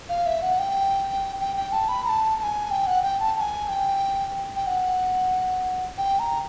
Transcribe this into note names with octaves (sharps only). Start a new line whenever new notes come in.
F5
E5
F#5
G5
G5
G5
A5
B5
A#5
A5
A5
G#5
G5
F#5
G5
A5
A5
G#5
G5
G5
F#5
G5
A#5